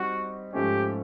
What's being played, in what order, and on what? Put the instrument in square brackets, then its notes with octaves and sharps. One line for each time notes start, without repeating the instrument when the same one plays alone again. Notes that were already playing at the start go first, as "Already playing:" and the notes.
Already playing: [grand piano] G3 C4 D#4 [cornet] F#4
[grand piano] G#2 F3 A3 C#4 [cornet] G4